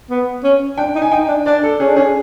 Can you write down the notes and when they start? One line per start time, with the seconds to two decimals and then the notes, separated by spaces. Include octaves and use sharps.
0.10 B3
0.44 C#4
0.78 D4 G5
0.95 D#4
1.02 G#5
1.12 D#4 G5
1.28 D4
1.46 D4 D5
1.63 A4
1.80 C#4 G#4
1.89 D4
1.96 C#4 G#4